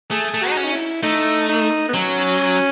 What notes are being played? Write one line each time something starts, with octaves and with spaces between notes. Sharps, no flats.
A3 G#4
A3
F#4
D#4
C#4
D#4
E4
A3 D#4
D#4
B3
F#3 C#4